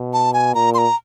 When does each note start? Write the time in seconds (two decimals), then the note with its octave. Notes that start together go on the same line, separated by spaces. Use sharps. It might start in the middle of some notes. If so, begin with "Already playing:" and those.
Already playing: B2
0.13 A5
0.34 G#5
0.54 A#2 A#5
0.74 C6
0.78 A#5